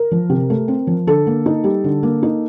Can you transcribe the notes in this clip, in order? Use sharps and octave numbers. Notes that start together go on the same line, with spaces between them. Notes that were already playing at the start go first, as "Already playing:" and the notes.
Already playing: A#4
F3
C3
A3
C4
F3
D3 A4
A#3
D#4
G3
D3
A#3
D#4